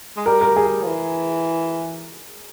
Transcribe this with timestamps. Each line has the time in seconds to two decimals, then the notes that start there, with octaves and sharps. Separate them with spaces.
0.17 G#3
0.26 G3 A#4
0.41 A#4
0.56 G#4
0.82 F3
0.87 E3